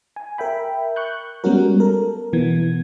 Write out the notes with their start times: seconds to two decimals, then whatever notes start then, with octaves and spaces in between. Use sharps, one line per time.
0.16 G#5
0.38 A#4 E5 G5 B5
0.96 C#6 F#6 G6
1.44 G3 G#3 B3 C#4 F#4 A#4
1.80 A4 A#4
2.33 B2 E3 B3 G#6